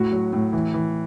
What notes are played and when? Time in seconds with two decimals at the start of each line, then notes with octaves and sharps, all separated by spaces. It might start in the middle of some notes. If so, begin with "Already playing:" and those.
Already playing: A2 F#4
0.12 F#3
0.33 A2
0.53 E3
0.74 E3